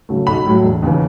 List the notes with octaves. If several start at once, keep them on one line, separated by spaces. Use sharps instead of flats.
C#3 F#3 A3
B1 B5
A2 F#3 A3
E1
D#2 C#3 E3